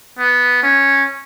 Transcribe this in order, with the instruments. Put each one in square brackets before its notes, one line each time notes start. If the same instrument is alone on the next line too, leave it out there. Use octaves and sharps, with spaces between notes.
[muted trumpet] B3
C#4